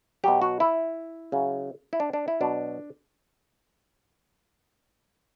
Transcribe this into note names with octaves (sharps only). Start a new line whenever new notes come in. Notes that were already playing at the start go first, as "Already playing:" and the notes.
B2 F#3 G4
F#4
E4
C#3 F#3
E4
D4
D4
E4
B2 F#3 D4